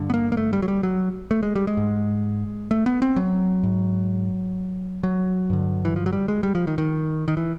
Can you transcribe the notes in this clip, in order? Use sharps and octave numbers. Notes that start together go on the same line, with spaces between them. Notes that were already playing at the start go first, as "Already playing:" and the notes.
Already playing: G2 D3
B3
A#3
A#3
A3
G3
F#3
G3
F#3
A3
G#3
G3
G#3
G#2
A3
B3
C4
F#3
G#2
F#3
G2 D3
E3
F3
F#3
G3
G#3
G3
F3
D#3
D#3
D#3
E3